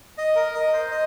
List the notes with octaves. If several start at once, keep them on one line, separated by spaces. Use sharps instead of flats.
D#5
A#4
D#5
C5
D#5